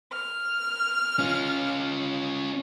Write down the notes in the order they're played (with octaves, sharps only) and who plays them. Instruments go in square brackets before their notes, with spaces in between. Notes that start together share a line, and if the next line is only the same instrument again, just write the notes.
[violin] F6
[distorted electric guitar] C#4 F4